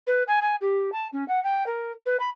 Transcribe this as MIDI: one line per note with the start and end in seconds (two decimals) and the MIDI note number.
0.07 0.23 71
0.27 0.39 80
0.41 0.55 80
0.61 0.90 67
0.92 1.08 81
1.12 1.26 61
1.28 1.42 78
1.43 1.66 79
1.66 1.92 70
2.06 2.17 71
2.19 2.29 83